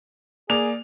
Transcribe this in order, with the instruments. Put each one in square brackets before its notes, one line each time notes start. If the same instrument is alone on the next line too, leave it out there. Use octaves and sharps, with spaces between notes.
[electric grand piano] A#3 [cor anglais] G#4 [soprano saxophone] D5 [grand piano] F7